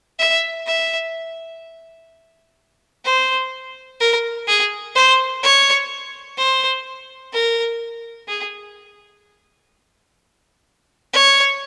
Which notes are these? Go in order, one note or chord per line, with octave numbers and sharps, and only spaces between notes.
E5
E5
C5
A#4
G#4
C5
C#5
C5
A#4
G#4
C#5